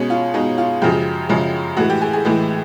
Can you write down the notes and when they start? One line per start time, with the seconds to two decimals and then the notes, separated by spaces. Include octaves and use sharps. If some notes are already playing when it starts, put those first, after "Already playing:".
Already playing: B2 G#3 C#4
0.10 F4
0.34 B2 G#3 D#4
0.58 F4
0.82 F#2 C#3 F3 G#3 G4
1.29 F#2 C#3 F3 G#3
1.77 A2 E3 G#3 F#4
1.90 G4
2.01 G#4
2.13 G#4
2.25 A2 E3 G#3